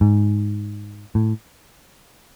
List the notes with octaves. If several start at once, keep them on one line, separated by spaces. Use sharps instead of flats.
G#2
A2